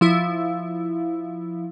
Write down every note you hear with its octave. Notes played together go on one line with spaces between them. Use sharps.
F3 E4